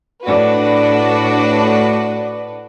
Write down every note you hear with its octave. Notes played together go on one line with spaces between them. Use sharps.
A2 D4 F#4 B4